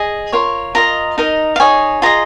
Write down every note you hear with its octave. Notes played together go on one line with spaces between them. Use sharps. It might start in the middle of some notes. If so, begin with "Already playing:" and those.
Already playing: G#4 D#5
F4 A#4 C#5
F4 A#4 D#5 A#5
D#4 A#4 D#5
F5
D#4 G#4 C#5 G#5
F4 G#4 D#5 A#5